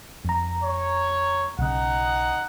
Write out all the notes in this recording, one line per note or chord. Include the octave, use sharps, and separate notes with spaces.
F2 A#5
C#5
B1 C#3 D#4 F#5